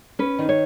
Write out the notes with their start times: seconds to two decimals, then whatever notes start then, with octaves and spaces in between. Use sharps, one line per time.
0.19 C#4 B4
0.39 D#3
0.49 C#5